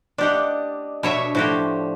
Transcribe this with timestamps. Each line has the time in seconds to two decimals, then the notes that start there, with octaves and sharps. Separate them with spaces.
0.18 D4 G4 D5 D#5 F#5
1.03 B2 D4 C#5 E5
1.35 A2 F3 F#4 G4